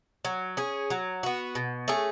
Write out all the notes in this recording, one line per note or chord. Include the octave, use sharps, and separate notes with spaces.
F#3
C#4 G#4
F#3
B3 F#4
B2
A3 C#4 G#4